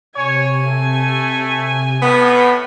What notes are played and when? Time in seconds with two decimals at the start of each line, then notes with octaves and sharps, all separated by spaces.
0.16 C3 C#5 G#5
0.65 A3
2.02 A2 B3